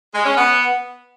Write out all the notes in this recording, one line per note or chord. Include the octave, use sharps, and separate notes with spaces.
G#3
C#4
B3